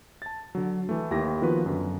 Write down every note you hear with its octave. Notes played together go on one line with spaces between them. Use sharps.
A5 A6
D3 F#3
E3 A3
D#2 E4 G4 A#6
D#3 F3 B3 F4 F#4 B4
F#2 D3